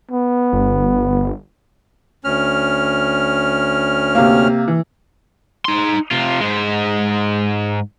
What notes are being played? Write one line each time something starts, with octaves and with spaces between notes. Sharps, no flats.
B3
G1
D2 C#4 F6
C3 A#3
E3
D#4 C6
C3 F4
G#2 G#3